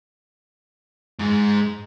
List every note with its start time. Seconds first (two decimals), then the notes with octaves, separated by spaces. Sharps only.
1.19 G#2